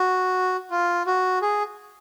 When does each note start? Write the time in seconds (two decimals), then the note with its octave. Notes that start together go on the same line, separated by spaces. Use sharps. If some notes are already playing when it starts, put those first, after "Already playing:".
Already playing: F#4
0.71 F4
1.07 F#4
1.42 G#4